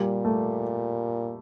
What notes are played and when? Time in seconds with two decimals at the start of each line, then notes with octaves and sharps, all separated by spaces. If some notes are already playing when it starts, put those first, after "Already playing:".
Already playing: A#2 G3
0.25 A3